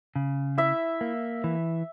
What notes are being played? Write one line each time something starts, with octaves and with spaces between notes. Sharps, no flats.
C#3
E4 E5
A#3
E3